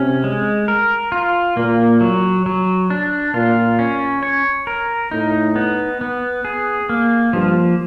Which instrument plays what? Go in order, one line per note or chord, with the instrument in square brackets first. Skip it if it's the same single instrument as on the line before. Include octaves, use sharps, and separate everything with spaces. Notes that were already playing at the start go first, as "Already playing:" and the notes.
Already playing: [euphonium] C3 [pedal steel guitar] C#4
[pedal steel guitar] G#3
A#4
F4
[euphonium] A#2 [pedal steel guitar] A#3
[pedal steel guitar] F#3
F#3
D4
[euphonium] A#2 [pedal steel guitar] F4
[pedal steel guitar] C#4
C#5
A#4
[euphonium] A2 [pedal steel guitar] D#4
[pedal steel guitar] B3
B3
G#4
A#3
[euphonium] G2 [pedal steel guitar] F3